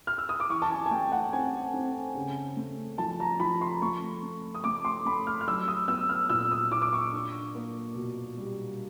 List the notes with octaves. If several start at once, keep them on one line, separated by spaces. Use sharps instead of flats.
F6
E6
D#6
D6
E3 C#6
A5
G#5
G#5
A3 G5
F#5
C4 G#5
C4
C#3
A3
F3 A5
A#5
F3 B5
C6
A3 C#6
A3
D#6
A3 D6
C6
A3 B5
F6
F6
F#3 E6
D#6
B3 E6
F6
A#2 E6
D#6
A#2 D6
D6
C#6
D4
A#3
B2
G3